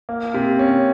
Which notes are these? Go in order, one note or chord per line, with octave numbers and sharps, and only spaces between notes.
A#3
C3
C#4